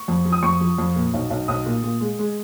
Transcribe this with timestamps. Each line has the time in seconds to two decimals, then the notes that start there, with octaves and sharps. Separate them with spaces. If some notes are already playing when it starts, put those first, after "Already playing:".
Already playing: C#6
0.08 F2
0.25 F3
0.32 D#6
0.43 F2 C#6
0.61 F3
0.78 F2
0.95 A#2
1.14 B1
1.30 B1
1.48 B1 D#6
1.66 A#2
1.83 A#2
2.01 G#3
2.19 G#3